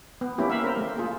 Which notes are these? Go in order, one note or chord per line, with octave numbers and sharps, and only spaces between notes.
B3
A#3 B3 C#4 E4 G4
E5 F5 B5
A#4 C5
A3 A#3
F4 G#4